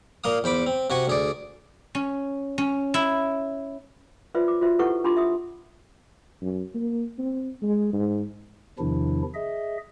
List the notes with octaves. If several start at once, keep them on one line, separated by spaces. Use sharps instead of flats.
A#2 A#3 F5 D#6
E2 C5 B5 D6
C4
C3 F#4 G#5 C#6
D2 G#4 D5
C#4
C#4
E4
F4 B4 C5 D5 E5
D6
F4 F#4 C5 E5
E4 G4 A4 B4 F#5 C#6
D4 F4 G4 A#5 C6 D6
E5 D#6
F#2
A#3
C4
G#3
G#2
E2 C3 D#3 F3 D4 E4
G#4 D#5 E5